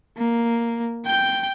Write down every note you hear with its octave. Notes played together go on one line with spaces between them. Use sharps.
A#3
G5 G6